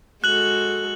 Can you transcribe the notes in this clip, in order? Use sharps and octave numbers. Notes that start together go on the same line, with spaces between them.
G#3 F#4 A4 F#6 F#7